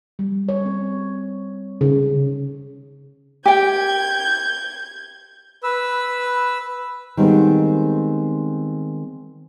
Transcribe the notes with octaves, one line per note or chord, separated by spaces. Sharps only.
G3
C#5
C4
C#3
G4 G5 G6 G#6
B4 E6
D#3 G3 G#3 B3 C4